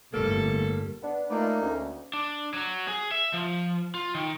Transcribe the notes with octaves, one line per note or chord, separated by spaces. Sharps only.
G1 A2 G3 A#3 A4
B3 D4
A3 A#3 D#4 F4 B4 D5
D2 C#4
D4
F#3
G#4
E5
F3
F4
D#3